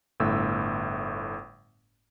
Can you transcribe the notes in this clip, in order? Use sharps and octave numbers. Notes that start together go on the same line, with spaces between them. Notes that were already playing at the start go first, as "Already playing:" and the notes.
G1 A2 E6